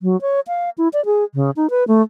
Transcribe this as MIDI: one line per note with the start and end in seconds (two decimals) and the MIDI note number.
0.02 0.19 54
0.21 0.40 73
0.48 0.70 77
0.78 0.88 64
0.93 1.04 74
1.05 1.24 68
1.34 1.50 49
1.56 1.70 63
1.70 1.84 71
1.88 2.02 57